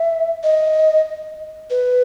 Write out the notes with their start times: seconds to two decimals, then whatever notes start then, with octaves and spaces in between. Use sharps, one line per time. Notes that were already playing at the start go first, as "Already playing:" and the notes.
Already playing: E5
0.44 D#5
1.70 B4